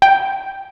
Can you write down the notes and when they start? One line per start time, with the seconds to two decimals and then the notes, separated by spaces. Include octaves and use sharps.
0.02 G5